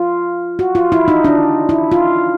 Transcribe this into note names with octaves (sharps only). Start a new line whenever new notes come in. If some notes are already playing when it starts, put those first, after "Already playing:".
Already playing: F4
F#4
F4
E4
D#4
D4
E4
F4